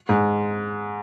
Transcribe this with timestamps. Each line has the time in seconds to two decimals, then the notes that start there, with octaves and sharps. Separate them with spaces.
0.09 G#2